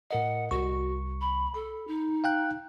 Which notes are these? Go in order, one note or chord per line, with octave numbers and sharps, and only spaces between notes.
A2 A#4 D#5 F#5
C2 F#4 C#6
B5
A4 B5
D#4
F5 G5 F#6